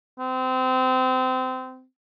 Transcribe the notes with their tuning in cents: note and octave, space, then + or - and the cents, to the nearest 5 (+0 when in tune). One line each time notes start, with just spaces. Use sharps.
C4 -25